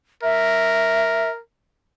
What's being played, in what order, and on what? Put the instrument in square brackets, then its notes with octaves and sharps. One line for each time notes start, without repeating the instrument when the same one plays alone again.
[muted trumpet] A#4 [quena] E5